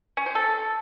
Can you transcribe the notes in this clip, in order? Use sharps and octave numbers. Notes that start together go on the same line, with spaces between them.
C#4
C5
A4